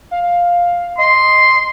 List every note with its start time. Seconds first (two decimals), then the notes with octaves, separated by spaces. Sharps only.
0.11 F5
0.98 D#5 C6